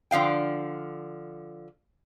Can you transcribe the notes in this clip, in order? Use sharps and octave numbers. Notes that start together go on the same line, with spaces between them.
D3 F3 F5 G5